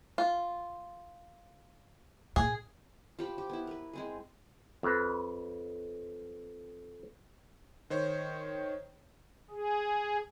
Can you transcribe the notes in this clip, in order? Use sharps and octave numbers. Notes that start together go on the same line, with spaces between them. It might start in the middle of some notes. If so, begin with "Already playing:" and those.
F4
A#2 G#4
F3 G4 B5
G4
B3 E4
A#4 B4
G#3 C4 G#4
F2 B4
D#3 C5 C#5
G#4